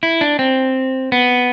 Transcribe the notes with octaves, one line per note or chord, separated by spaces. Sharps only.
E4
D4
C4
B3